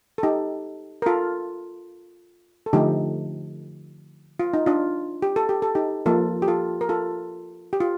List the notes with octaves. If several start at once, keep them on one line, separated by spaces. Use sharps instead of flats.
A4
D#4 G4
A#4
F4 A4
A4
D3 F3 A3 D#4 G4
F4
D#4
D4 F4
G4
A4
G4
A4
D#4 G4
F3 A#3 F4 A4
G4
F4 A4
A#4
F4 A4
G4
F4